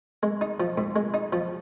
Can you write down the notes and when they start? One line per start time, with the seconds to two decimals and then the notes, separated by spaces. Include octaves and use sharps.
0.23 G#3
0.41 D#4
0.60 F3
0.78 G#2
0.96 G#3
1.14 D#4
1.33 F3